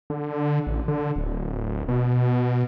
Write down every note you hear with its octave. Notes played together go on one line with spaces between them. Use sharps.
D3
A1
D3
D1
B2